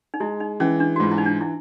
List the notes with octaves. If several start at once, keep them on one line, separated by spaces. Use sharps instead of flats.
D#4
G#3 E4
D#4
E3 C#4
D4
F#4
G#2 F4
E4
D#4
D4
E4